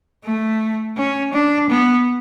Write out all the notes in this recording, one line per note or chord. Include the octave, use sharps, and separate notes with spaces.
A3
C#4
D4
B3